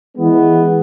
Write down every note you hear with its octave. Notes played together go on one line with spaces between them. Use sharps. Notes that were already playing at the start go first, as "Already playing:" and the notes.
E3 G#3 B3